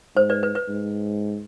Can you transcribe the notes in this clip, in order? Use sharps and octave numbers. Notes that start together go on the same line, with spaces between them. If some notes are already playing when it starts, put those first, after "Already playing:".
G#2 C5
B4 D5
B4
B4
G#2